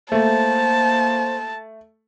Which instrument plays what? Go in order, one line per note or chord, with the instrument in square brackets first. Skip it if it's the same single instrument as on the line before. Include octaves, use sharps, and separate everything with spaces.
[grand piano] A3 [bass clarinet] A#3 [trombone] C5 [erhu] A5